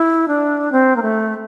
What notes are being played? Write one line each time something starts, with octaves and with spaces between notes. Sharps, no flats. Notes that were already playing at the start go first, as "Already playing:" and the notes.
Already playing: E4
D4
C4
A#3
A3